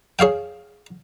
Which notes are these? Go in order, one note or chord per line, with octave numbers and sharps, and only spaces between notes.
G#4 C#5 F5 G5